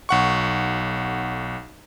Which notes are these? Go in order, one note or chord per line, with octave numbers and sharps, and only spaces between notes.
B1 F#5 C#6